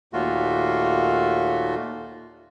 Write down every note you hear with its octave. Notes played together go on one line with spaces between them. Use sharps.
D#2 A#2 A3 F4 F#4